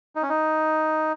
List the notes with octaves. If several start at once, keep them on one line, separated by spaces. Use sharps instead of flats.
D#4
C#4
D#4